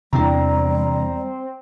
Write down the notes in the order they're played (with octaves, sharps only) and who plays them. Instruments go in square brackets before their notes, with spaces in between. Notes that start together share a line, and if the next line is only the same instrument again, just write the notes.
[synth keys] E2 A#5 [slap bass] C3 D4 [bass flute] G3 [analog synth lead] C4